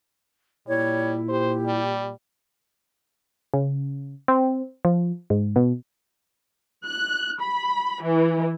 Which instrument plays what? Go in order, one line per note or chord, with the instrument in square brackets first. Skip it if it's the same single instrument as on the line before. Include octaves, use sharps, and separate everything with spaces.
[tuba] A#2 [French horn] G3 [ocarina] E4 [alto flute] C#5
[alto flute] G4 [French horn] C5
[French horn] G3
[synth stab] C#3
C4
F3
G#2
B2
[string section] F#6
B5
E3